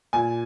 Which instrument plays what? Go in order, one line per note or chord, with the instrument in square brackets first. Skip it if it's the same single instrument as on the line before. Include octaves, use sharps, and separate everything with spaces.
[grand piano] A#2 G#5